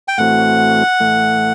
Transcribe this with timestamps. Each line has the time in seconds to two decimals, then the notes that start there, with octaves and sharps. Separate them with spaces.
0.08 G5
0.18 A2 E3 A3 C4 F#4 F#5
1.00 A2 E3 A3